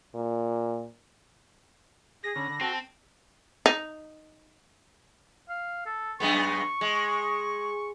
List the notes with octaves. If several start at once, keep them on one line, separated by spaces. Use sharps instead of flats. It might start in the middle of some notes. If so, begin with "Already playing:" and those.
A#2
G#4 A#6
D3 C#4 B5
D3
C4 F#4 A4 A5
D#4
F5
A4
F#2 G#3 B3 C#6
G#3